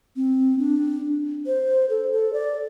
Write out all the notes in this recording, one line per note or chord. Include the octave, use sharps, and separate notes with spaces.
C4
D4
C5
A4
A4
D5